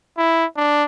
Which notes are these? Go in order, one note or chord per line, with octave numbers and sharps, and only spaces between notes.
E4
D4